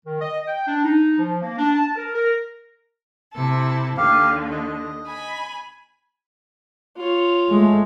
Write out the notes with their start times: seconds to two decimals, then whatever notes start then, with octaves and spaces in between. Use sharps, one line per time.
0.05 D#3
0.21 D#5
0.48 G5
0.67 D4
0.84 D#4
1.19 F3
1.42 A#3
1.58 D4
1.73 A5
1.96 A#4
2.14 A#4
3.34 C3 E4 A4
3.97 D#2 D3 G4 F5
4.52 D#5
5.05 G#5 B5
6.97 F4 C#5
7.50 G#3 A3